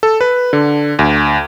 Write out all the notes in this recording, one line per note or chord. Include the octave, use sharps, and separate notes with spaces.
A4
B4
D3
D2